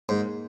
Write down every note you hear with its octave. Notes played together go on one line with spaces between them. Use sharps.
G#2 A#3 D#4 G#4